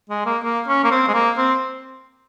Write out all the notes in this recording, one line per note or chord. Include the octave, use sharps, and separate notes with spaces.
G#3
A#3
A#3
C#4
A#3
C4
G#3
A#3
C4